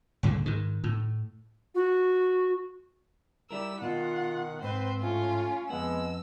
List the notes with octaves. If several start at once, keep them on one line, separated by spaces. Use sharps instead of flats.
C#2 G2 A#2 D3
G#2 D#3
A2
F#4
G3 E4 A#4 E6
B2 D#3 F4 F#5
G#2 C4 B4 C5
A2 C#4 F4
F2 G#3 B3 F#5 E6